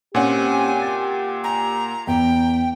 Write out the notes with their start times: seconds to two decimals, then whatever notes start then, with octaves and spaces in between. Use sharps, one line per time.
0.15 A#2 C4 C#4 F4 G4 F#5 G#5
0.82 A6
1.44 G#5 A#5
2.07 E2 G5